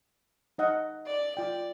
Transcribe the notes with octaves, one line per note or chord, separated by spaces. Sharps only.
D#4 D#5 F#5
D5
F4 D5 G5